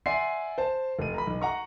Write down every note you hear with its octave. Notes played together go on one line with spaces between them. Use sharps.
D5 E5 F#5 G#5 C6 C7
C5 A5
F1 D#7
A#5 B5
B1
F#5 A#5 C#6